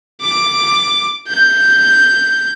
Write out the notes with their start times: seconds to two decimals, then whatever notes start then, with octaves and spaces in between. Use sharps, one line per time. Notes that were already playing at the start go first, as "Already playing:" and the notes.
0.22 D6
1.29 G6